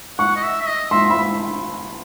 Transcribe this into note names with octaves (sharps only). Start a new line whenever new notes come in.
F#5 C#6
D#5
E5
E5
D#5
E5 C6
E5 B5